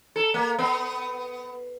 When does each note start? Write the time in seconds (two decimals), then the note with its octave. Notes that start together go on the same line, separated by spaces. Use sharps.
0.16 A4
0.34 A#3
0.59 B3